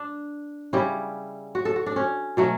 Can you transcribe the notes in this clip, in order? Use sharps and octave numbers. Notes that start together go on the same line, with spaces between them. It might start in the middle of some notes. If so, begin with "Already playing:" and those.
Already playing: D4
C#3 G3 C#4 E4
F#4
A4
F#4
D4
C#4
B2 F#3 A3 C#4